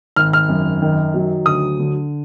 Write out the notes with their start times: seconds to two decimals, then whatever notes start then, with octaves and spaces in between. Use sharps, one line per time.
0.16 G#1 F6
0.33 F6
0.49 F#2
0.82 D#3
1.14 F#3
1.46 D2 D#6
1.79 D3